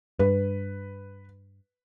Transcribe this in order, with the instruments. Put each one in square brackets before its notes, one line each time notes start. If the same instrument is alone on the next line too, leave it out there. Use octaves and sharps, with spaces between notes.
[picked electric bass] G2 [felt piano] B4